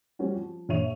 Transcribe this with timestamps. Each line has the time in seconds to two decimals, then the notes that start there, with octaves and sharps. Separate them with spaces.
0.19 F3 G3 C4 C#4 F#4
0.35 F3
0.69 A#1 C#5 E5 C#6 D#7 F7